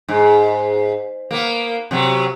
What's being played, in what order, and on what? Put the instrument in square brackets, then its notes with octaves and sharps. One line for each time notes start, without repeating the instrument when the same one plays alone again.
[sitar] G#2
A#3 B3
C3 F#3 B3